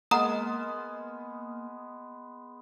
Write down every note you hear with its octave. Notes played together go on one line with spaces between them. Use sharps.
G#3 A#3 B3 F#5 A#5 C6 D#6 F6